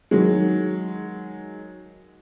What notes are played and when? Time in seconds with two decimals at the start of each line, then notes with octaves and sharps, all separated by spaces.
0.11 D#3 F#3 G#3